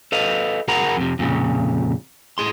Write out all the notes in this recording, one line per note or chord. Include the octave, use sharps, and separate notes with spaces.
A4 B4 D#5 F5
F#4 G#4 A#4 F#5 A#5 B5
F2 C3
F2 A#2 C#3
A2 G#4 C6